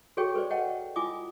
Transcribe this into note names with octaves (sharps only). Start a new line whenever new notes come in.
F#4 G#4 A4 C#5 G5 C#6
A4 B4 C5 D5
C#5 D#5 F#5 G5 A5
E4 F4 G#5 D6 D#6